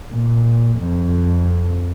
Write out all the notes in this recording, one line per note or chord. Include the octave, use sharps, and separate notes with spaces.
A#2
F2